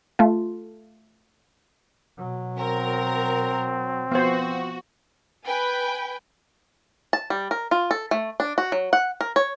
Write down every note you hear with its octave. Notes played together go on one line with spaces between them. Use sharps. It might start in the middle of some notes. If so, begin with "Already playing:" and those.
A3 F4
B2 F#3
C4 A#4
F3 B3 F#4 C5
B4 G5 G#5
A5
G3
A#4
F4
A4
A3
D4
F#4
F#3
F#5
A#4
C#5